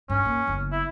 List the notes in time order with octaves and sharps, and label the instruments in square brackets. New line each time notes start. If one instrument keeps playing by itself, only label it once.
[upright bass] G2 [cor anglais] C#4
[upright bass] A#3
F#1 B3
[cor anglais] E4